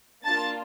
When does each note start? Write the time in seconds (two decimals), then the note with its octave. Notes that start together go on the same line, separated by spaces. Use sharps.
0.25 A#3 D4 F4 A5 A6